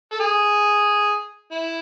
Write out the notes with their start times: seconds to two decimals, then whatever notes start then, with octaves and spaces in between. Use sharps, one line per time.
0.12 A4
0.20 G#4
1.52 E4